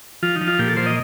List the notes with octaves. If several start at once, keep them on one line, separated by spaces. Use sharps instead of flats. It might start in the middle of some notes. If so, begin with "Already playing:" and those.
F3 F4
D#4
F3
F4
A#2 G4
A4
F3 C5
D#5